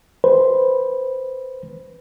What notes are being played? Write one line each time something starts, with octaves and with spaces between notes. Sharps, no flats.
B4 C5